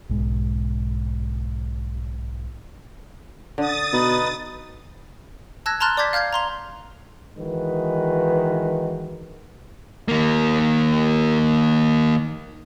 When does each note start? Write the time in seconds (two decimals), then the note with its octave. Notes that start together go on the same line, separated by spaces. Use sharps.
0.09 B1 G#2
3.58 D3 D#6 A6
3.93 B2 D#4 B4
5.66 A5 E6 F#6 G#6 A#6
5.80 A5 A#5 C6 F6 F#6 A6
5.97 D5 D6 G6 G#6 B6
6.13 F5 F6 G6 G#6 C7
6.33 A#5 C6 F7
7.37 D#3 E3 G#3 F#4 B4
10.08 D#3 A#3